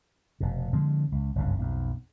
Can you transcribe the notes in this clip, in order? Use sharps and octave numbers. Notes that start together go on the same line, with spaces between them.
F1 B2
D3 F3 G#3 C4
C#2
F#1 C2 G2 C#3
B1 F2